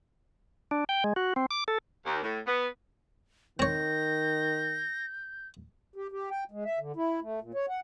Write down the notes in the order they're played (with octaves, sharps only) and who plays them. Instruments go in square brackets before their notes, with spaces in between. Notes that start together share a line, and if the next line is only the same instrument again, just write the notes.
[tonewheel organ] D4
G5
G#3
F#4
C4
D6
A4
[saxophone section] D#2
A2
B3
[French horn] D#3 [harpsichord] C4 C#5 [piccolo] G6 [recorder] A#6
[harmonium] G4
G4
G5
G#3
E5
D3
E4
A3
A#2
C#5
F#5